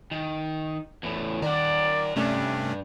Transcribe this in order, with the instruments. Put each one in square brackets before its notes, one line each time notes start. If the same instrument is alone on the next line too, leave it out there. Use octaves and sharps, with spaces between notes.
[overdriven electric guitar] D#3
E2 A2
[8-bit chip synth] D#3 [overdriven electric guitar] A#4 F#5 [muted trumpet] D5
[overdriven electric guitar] G2 [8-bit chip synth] C3 A3 C#4 [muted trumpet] D4